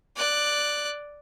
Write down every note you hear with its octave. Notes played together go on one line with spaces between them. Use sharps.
D5 F#6